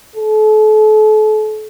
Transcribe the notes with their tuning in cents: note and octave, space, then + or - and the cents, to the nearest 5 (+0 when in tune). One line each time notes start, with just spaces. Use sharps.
A4 -40